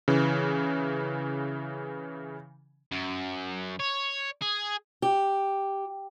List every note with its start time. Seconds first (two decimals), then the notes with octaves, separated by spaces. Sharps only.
0.08 C#3 E3
2.91 F#2
3.80 C#5
4.42 G#4
5.02 G4